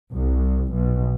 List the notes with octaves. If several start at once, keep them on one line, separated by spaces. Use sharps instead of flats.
C2
B1